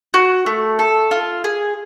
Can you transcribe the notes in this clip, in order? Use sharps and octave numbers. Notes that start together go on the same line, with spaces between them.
F#4
A3
A4
F4
G#4